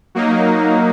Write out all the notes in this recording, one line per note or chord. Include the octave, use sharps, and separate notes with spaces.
F#3 A#3 D#4